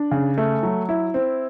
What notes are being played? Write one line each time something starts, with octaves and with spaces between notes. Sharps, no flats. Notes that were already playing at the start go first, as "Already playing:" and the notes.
Already playing: D4
C#3
A3
F#3
E4
C4